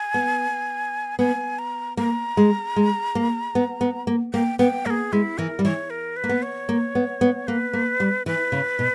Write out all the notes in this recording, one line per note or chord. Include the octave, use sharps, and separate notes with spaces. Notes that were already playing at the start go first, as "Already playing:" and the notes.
Already playing: G#5
B3
B3 G#5
A#5
A#3 A#5
G#3
G#3
A#3
B3
B3
A#3
A#3 G5
B3 G5
A#3 A#4
G#4
G#3 E4
E3 A#4
G3
E3 C#5
A#4
B4
A#3
B3
C#5
A#3
B3
B3
A#3 B4
A#3
G3
E3 B4
C#3
B2